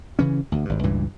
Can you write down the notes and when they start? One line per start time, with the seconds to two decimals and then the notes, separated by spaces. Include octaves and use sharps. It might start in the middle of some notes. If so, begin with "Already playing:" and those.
0.19 C#3 E3 C#4
0.52 D2
0.65 G#1 G2
0.83 C#2 G2 A#2 E3